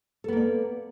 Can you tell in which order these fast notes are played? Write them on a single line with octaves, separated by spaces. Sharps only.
A4 B3 A#3 D5